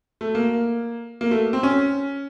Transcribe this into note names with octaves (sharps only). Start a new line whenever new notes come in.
A3
A#3
A#3
A3
C4
C#4